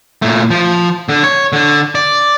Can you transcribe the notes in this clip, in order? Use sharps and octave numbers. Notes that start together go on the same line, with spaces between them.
A#2 A3
F3
D3
C#5
D3
D5